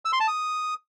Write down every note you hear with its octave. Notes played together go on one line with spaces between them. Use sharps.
E6
C6
A5
D#6